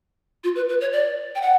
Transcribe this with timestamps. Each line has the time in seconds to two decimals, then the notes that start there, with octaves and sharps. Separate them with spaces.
0.44 F4
0.56 B4
0.69 B4
0.81 C#5
0.93 D5
1.35 G5
1.42 F#5